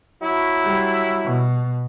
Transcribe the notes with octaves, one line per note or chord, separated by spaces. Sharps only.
F#3 E4
G3
B2